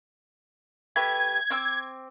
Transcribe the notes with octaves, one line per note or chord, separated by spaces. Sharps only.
A3 G4 B4 G#6
C4 D6 E6